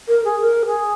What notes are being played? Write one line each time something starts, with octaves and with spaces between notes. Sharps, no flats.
A#4
G#4
A#4
G#4